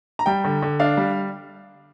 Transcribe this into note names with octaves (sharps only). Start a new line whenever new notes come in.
A#5
G3 G5
D3
D3
D4 F5
G3